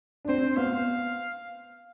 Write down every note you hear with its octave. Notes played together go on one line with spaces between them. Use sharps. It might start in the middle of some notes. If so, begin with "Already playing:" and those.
D4
C4 C5
B3 F5